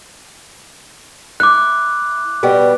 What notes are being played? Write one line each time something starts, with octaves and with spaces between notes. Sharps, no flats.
E4 D6 F#6
B2 G3 G4